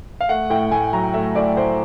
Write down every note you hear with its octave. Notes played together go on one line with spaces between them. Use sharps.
F5
A3 F#5
A2 G5
A2 G#5
F#3 A#5
A3 E5
A2 D5
A2 C5